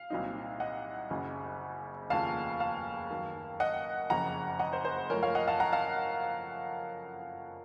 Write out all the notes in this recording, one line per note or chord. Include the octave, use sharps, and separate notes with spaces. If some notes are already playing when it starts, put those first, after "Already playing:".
Already playing: F5
C2 A#2 F#3 C4 D#4
D#5 F#5
F#1 F#2 C#3
F1 D#2 C#3 F3 F5 A5
F5 A5
F#2 D#3 F#3
D#5 F#5
F#1 F2 C#3 F#5 A#5
D#5 F#5
C5
C5
F#2 F3 A3 A#4 C#5
C#5 F5
D#5 F#5
F5 A5
F#5 A#5
F5 A5